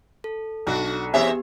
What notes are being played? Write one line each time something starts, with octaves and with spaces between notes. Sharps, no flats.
A4
B1 D4 F#4
E2 B3 C4 G4 G#4 E5